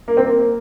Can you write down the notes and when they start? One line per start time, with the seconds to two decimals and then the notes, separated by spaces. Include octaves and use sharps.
0.08 A#3
0.17 C4
0.26 A#3
0.39 A#3